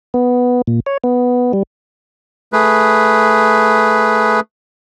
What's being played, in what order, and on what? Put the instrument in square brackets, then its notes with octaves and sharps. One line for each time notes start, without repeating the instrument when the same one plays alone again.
[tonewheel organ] B3
A#2
C#5
B3
G3
[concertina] A3 G#4 B4